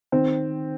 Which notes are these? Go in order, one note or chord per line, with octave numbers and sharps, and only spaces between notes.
D#3 C4